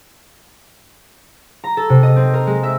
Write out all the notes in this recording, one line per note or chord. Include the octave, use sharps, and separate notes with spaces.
A#5
A4
C3
D#5
C4
A#4
G#3
E5